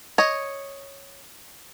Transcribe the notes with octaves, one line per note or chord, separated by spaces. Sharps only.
C#5 D#5